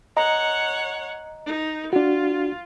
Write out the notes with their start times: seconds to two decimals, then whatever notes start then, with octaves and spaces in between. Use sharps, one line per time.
0.17 C#5 D#5 F#5 A#5
1.46 D#4
1.93 D4 F4 F#4